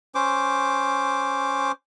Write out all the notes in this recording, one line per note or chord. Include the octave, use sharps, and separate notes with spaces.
C#4 C5 D6